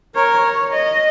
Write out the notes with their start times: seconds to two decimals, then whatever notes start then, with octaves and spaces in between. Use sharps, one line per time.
0.15 A#4 C#5
0.44 C#5
0.73 D#5